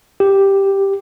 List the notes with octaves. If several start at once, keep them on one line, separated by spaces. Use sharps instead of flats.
G4